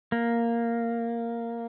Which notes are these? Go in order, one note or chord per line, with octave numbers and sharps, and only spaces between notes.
A#3